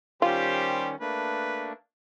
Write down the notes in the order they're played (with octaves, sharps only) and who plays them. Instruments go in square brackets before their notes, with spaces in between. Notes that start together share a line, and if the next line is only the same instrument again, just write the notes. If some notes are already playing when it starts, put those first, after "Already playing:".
[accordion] D#3 C#4 [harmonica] G3 G4 C5 [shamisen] F4
[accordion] A3 A#3 D4 [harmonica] B4